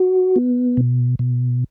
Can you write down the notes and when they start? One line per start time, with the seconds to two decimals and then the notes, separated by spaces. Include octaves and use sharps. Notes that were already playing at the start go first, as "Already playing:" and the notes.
Already playing: F#4
0.36 B3
0.77 B2
1.19 B2